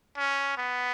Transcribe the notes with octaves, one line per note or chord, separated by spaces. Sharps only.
C#4
B3